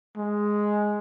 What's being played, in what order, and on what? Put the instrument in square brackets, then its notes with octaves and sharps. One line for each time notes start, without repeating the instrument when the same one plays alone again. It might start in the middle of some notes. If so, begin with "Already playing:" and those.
[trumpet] G#3